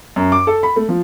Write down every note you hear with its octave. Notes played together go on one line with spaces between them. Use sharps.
F#2
D6
A4
B5
A3
F3